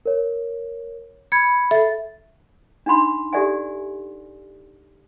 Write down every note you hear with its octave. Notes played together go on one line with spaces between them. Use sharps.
A#4 C#5
B5 G#6 C#7
A4 E5
D4 D#4 F#5 B5 C6
G4 A4 D5 E5 F#5 G#5